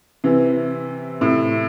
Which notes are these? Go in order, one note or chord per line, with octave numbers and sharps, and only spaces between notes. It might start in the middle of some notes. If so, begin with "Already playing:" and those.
C3 E3
A2 C3